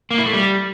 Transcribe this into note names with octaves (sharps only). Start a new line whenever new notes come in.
A#3
E4
A3
G3